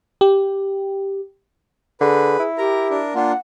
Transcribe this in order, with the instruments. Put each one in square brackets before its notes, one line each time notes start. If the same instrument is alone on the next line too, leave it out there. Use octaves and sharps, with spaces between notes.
[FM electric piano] G4
[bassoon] D3 [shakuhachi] G#4 [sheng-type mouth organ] B4
[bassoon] E4
[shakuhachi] G4 [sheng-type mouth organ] A#4 A#5
[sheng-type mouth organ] D4 A#4
[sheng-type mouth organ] A#3 D4 F4 [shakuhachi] F#5